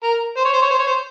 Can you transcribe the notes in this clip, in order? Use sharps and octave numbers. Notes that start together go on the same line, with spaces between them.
A#4
C5
C#5
C5
C#5
C5
C#5
C5